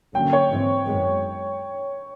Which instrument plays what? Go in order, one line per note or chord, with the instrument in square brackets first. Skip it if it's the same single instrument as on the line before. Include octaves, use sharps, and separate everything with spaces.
[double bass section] D3 F#3 A#3 C#4 [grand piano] G5
[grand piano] C#5
[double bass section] G#2 E3 G#3 C4
F#2 D#3 G#3 B3